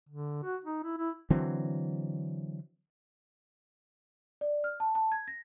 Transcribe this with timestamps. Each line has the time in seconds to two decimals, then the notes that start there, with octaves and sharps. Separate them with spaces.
0.09 D3
0.44 F#4
0.64 D#4
0.84 E4
0.98 E4
1.30 D3 E3 F#3 C4
4.41 D5
4.64 F6
4.80 A5
4.95 A5
5.12 G#6
5.28 A#6